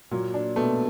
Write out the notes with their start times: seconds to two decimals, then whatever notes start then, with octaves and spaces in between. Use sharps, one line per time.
0.11 A#2 F#3 A#3
0.34 D4
0.56 B2 A3 B3